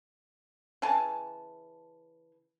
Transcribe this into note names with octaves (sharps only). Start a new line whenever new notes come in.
C#3 E3 G#5 A5